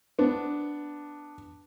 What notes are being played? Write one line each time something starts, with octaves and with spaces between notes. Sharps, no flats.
B3 D4